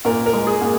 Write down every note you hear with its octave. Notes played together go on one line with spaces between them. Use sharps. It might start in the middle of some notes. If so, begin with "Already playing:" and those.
A#2 A#4
A#4
G#3
G#4
A#2